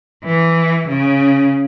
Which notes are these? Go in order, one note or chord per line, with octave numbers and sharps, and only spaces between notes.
E3
C#3